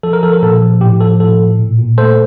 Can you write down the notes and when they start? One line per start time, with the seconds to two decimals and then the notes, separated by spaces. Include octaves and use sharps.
0.03 F3 A4
0.13 A#4
0.23 F3 A4
0.33 A#4
0.42 A#2 A4
0.62 F3
0.81 A2 G4
1.00 F3 A4
1.20 A2 A4
1.39 A2
1.59 A#2
1.79 A#2
1.98 A3 A4 C5